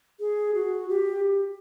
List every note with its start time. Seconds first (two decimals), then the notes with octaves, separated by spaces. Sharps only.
0.20 G#4
0.54 F#4
0.89 G4